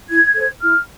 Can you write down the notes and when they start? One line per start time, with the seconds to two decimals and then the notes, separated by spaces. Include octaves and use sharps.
0.09 E4 G#6
0.34 A4 C5
0.61 E4 F6